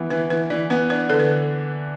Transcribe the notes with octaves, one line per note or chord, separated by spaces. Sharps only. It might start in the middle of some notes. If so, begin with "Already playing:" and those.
Already playing: E3 B3
E3 B4
E3 B4
E3 D5
B3 B4
D4 B4
D3 A4
B4